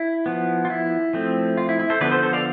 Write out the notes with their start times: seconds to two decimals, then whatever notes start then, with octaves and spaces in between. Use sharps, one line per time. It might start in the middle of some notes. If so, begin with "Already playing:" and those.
Already playing: E4
0.26 F3 B3
0.65 F4
0.70 E4
1.13 F3 A3 C4
1.57 F4
1.69 E4
1.79 E4
1.90 A4 C5
2.01 D3 F3 B3 B4 D5
2.11 A4 C5
2.23 A4 C5
2.33 D5 F5